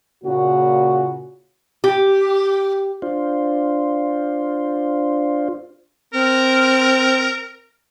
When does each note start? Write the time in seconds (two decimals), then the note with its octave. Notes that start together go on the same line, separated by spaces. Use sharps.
0.24 A#2 C#3 F#4
1.84 G4
3.02 D4 F4 C5
6.14 C4 A#4